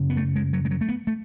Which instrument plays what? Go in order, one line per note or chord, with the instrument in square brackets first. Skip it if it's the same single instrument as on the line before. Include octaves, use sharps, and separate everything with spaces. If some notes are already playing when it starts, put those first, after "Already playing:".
Already playing: [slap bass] F#2 C#3
B3
A3
G#3
F#3
G#3
F#3
A3
B3
A3